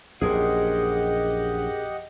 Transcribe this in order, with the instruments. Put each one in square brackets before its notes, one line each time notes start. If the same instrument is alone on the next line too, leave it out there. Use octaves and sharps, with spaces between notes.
[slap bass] A#1 F#2 [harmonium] G4 D#5 F#5 [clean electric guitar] G#4 A#4 C5